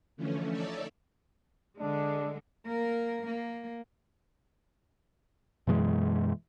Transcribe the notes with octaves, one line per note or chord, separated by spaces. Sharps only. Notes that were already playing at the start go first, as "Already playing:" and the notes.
D3 E3 F3 A3 C#4
D#4 A4 C#5 D5 E5
D3 G#3 D4
A#3 A#4
A#3
F#2 B2 E3 G#3